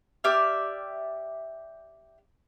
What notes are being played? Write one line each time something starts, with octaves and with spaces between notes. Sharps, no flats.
G4 D5 E5 F6